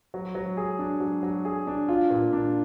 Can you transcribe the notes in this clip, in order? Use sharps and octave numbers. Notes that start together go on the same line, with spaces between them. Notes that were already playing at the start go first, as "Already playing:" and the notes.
F#3
F#3
G#4
D4
F#3
F#3
G#4
D4
F4
A#2
D4